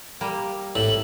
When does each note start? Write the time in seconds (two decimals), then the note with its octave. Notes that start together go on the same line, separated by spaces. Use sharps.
0.21 G3 A#3
0.76 G#1 A2 F#7